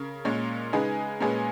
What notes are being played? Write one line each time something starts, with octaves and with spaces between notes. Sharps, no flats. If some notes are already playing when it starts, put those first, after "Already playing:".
Already playing: C#3 A#4
A#2 G#3 C#4
C#3 G#3 D#4 G#4 B4
A#2 G#3 C#4 G#4 B4